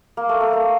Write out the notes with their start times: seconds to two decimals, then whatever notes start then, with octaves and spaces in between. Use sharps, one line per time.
0.17 A#3
0.29 A3
0.41 A3
0.53 A#3